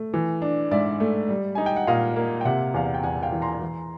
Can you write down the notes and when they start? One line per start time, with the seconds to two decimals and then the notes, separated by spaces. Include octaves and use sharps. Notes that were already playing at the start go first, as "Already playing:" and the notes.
Already playing: A3
0.14 E3
0.42 D4
0.71 G#2 D5 E5
1.00 A3
1.29 G3
1.55 D#4 G#5
1.66 G5
1.76 F#5
1.87 A#2 D#5 F5
2.16 A#3
2.41 G5
2.45 C3 E5 F#5
2.74 E2 F5
2.85 F#5
2.94 G5
3.03 E2 F#5 G#5
3.23 F5 G5
3.32 E3
3.42 A#5 C6
3.62 E3